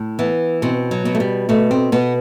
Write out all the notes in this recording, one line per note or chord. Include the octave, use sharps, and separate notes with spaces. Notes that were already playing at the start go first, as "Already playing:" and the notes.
Already playing: A2
E3 B3
B2 C4
F#3
B2
A3
G3
B2 A3
C4
B2 B3